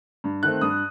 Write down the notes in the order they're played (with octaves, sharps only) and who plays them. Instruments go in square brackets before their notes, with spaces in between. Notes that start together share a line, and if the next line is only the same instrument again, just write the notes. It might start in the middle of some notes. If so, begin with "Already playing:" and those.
[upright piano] G2
D#3 A3 C4 F#6
G2 D#6